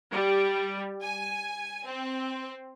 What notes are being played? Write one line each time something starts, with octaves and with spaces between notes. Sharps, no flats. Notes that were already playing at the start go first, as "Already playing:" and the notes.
G3
G#5
C4